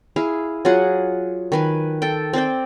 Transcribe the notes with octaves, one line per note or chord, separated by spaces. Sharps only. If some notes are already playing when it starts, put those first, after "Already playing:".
E4 G#4 F5
F#3 F4 G#4 F#5
D#3 B4 G#5
A4 G5
C4 C5 D5 G5